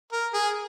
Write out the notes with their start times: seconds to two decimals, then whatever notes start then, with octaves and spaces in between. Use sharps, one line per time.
0.12 A#4
0.34 G#4